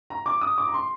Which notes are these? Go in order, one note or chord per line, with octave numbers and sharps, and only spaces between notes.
A#5
D6
D#6
D6
A#5
C6